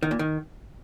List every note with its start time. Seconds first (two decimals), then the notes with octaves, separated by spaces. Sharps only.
0.03 D#3
0.11 A#2
0.19 D#3